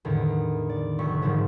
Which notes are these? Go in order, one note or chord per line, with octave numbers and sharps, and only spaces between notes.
E2 A2 D3 D#3
D5
F1 C#6 B6
G#2 D3 D#3 F3 F#3